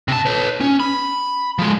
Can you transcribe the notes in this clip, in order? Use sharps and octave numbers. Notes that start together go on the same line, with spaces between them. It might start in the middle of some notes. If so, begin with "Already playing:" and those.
C3 A5
B4 C#5
C#4
B5
F3 G#3